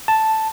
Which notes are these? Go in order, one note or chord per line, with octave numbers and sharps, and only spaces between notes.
A5